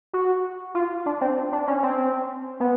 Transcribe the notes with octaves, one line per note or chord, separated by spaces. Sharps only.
F#4
F4
D4
C4
D4
C#4
C4
B3